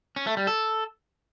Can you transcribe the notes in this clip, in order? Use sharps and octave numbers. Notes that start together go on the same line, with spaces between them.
C#4
A3
G3
A4